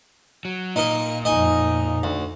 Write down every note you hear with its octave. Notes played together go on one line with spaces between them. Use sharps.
F#3
A#2 D#4 A#4 D#5
F2 D#4 D#5 G#5
D2